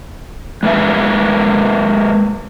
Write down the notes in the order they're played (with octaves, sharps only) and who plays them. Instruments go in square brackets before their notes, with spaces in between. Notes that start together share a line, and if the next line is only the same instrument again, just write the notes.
[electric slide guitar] G#3 A#3 B4 E5